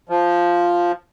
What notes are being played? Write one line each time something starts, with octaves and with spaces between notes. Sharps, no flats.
F3